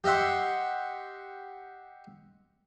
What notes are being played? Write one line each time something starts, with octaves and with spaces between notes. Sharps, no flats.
G4 D#5 E5 F#5 C6